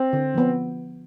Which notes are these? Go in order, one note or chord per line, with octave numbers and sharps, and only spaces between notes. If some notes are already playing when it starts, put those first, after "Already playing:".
Already playing: C4
D3
F3 B3